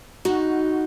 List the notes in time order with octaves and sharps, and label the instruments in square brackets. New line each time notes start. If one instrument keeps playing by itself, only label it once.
[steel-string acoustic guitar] D#4 [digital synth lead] F#4